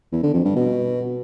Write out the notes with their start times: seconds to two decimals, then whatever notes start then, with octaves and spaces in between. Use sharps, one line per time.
0.12 E2
0.23 D3
0.34 F2
0.45 G2
0.56 B2